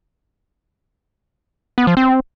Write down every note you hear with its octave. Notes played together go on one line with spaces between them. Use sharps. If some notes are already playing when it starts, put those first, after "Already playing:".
B3
F3
C4